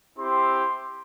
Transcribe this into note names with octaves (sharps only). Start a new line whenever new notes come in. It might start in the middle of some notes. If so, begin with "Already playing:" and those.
C4 E4 G4 C6